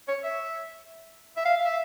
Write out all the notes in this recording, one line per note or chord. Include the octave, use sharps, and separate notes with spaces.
C#5
E5
E5
F5
E5